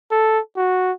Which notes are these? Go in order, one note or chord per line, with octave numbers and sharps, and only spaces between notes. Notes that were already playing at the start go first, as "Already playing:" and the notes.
A4
F#4